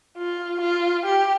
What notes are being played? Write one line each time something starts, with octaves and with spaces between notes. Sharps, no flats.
F4
F4
G4